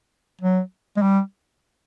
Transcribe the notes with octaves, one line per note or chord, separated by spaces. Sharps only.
F#3
G#3
G3